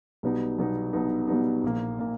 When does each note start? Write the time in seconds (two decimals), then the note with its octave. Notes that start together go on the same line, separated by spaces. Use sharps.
0.23 B1 B2 G3 B3 D#4
0.59 B1 B2 G3 B3 D#4
0.93 B1 B2 G3 B3 D#4
1.28 B1 B2 G3 B3 D#4
1.64 A#1 A#2 A#3
1.99 A#2 A#3